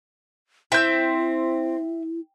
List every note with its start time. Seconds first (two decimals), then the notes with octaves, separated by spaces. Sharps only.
0.72 C4 E4 E5 G6